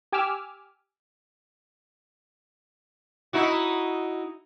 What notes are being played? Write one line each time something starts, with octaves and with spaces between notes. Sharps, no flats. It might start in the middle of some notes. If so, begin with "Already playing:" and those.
G4 G#5 D6 E6 F6
D#4 E4 F#4